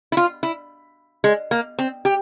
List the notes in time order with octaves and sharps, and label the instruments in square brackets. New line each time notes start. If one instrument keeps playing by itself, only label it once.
[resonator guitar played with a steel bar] E4
F4
E4
G#3
A#3
C4
G4